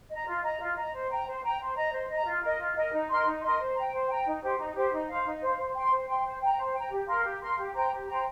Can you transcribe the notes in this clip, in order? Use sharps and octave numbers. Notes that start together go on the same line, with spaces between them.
D#5 A#5
F4
D#5 A#5
F4
D#5 A#5
C5
G5 A#5
C5
G5 A#5
C5
D#5 A#5
C5
D#5 A#5
F4
A#4 D#5
F4
A#4 D#5
D#4
A#4 D#5 C6
D#4
A#4 D#5 C6
C5
G5 A#5
C5
G5 A#5
D#4
G4 C5
D#4
G4 C5
D#4
C5 F5
D#4
C5 F5
C5
G5 C6
C5
G5 C6
C5
G5 A#5
C5
G5 A#5
G4
A#4 F5 C6
G4
A#4 F5 C6
G4
C5 G5 A#5
G4
C5 G5 A#5